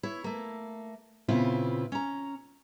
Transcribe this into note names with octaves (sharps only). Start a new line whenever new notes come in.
E4 C#5
A3 A#3
A#2 C#3 B3 C4 E4 F4
C#4 A#5